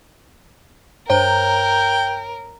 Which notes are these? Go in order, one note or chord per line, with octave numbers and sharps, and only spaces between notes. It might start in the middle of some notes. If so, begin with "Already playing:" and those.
G2 A#4 C5 C#5 G5 A#5